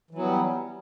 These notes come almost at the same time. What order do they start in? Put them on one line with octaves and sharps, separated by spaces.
E3 F#3 B3 G3